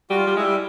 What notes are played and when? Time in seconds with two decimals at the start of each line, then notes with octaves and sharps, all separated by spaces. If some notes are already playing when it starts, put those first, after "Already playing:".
0.10 G3 F#4
0.16 F4
0.27 G3
0.36 G#3 E4
0.44 G3